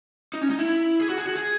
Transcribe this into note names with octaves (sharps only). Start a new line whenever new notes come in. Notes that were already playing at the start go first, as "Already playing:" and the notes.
D#4
C#4
D#4
E4
G#4
F#4
G#4
F#4
G#4